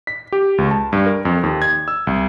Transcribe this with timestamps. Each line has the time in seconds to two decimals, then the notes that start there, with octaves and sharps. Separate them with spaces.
0.07 B6
0.32 G4
0.58 C#2
0.71 A5
0.93 G2
1.06 A#4
1.25 F2
1.43 D#2
1.62 G#6
1.88 E6
2.07 C2